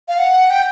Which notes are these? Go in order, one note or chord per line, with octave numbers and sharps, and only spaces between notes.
F5
F#5
G5